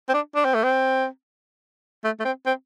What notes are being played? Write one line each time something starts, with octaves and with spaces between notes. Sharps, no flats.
C4
D4
D4
C4
A3
C4
A3
A3
C4
C4